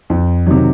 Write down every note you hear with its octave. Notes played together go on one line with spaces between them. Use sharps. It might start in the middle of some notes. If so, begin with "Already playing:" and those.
F2
C3 D#3 F#3